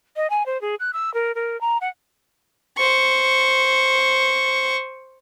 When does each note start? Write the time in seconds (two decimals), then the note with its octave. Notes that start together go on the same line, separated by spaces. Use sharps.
0.16 D#5
0.30 G#5
0.46 C5
0.61 G#4
0.80 F#6
0.93 E6
1.14 A#4
1.35 A#4
1.61 A#5
1.81 F#5
2.78 C5 C#6